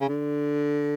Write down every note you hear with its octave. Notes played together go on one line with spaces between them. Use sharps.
C#3
D3